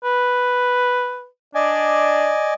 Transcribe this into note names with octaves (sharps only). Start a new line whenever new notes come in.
B4
D4 D5 D#5 G#5